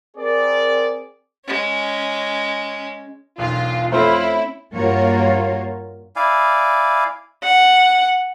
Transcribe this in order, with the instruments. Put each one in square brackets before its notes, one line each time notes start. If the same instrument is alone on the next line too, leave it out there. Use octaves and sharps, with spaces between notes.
[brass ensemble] C4 G#4 A#4 D5
[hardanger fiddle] G#3 C#4
[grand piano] E1 B1 [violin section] F4
[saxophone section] F2 F4 C5 [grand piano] A3 C4 C#4 [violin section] E4
[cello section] G2 A#3 F4 F#4 A#4 C#5
[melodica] E4 D5 F5 G#5
[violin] F#5